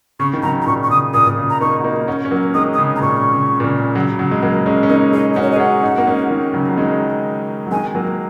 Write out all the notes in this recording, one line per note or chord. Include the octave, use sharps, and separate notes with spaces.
C#3 C#6
D#3
C#3 F#3 A#5
A#5
A#2 D#3 C#6
C#6
C#3 D#6
A#2 D#6
A#2
C#3
A#5
A#3 D#4 C#6
F#4
A#3 D#4
C#4 F#4
C#4
F#3 A#3
D#3 G#3 D#6
D#6
C#3
C#3 A#5
A#2 C#6
C#3
A#2
C#3
C#3 F#3
C#3 F#3
G#3
F#3 A#3
G#3 C#4
C#4
A#3 D#4 D#5
D#4 G#4 D#5
C#4 F#4 A#4
C#5
D#5
G#4
C#4 F#4 F#5
D#4
F#4
A#3 D#4
G#3 C#4
D#3 G#3
C#3 F#3
F#3
D#3 G#3
F#3
D#3 G#3 G#5
F#3 A#3